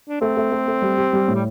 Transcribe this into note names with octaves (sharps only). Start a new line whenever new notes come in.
D4
A3 C4
A3
A3
A3
G3
G4
G3
A2
G3